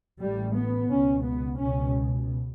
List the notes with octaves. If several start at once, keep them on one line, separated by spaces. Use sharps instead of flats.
A1 A2 G3
B3
C#2 B2 C#4
B3
C#2 B2 C#4